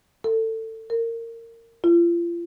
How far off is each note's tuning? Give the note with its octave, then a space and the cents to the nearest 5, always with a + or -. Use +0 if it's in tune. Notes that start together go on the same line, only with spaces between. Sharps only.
A4 +25
A#4 -25
F4 -35